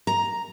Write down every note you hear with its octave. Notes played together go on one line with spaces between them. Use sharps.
A#5